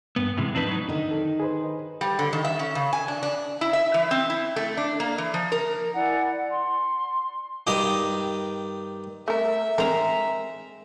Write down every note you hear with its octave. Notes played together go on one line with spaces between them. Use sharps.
G2 B3
G#2 C3 E3 G#3
F2 C4 D4 D#4 B4
F#3 D#4
D3 D#3 D#4
A4
G#4 B4 C5
G3
D3
D#3
E5
C#4
C#3
G#5
D4
D4
E4
E5
E3
C4
E4
A3
D4
A#3
E3
F3
A#4
E4 D5 F#5 G#5
C6
G2 D#3 G4 D#5
A3 A#4 E5
G#3 C4 A#4 A#5